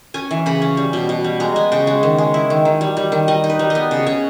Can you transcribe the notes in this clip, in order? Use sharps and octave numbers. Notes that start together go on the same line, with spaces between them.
C#4 G#5
E3
C#3 B5
C#4
G3
B2
B2
G3
G#3 A#5
B3 G#5
C#3 G5
G#3
D#3
G#3
E4
D#3
D#3
G3
G3
D#3
G3 D#5
D#4
B4
G3
D#5
B3
C#3
C#3 C#5